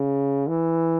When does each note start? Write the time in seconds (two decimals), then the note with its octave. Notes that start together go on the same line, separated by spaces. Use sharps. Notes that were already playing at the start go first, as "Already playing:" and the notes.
Already playing: C#3
0.48 E3